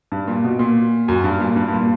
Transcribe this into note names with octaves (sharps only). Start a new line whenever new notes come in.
G2
A#2
B2
A#2
F#2
G2
A#2
G2
G2
A#2